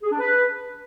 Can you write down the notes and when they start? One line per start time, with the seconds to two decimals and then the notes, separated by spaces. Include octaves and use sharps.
0.03 G#4
0.10 D4
0.18 B4